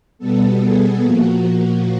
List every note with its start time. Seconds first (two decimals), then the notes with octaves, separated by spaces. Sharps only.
0.19 B2 G3 B3 A4
0.61 G#4
1.01 A#2 F3 A#3 F#4
1.43 F#4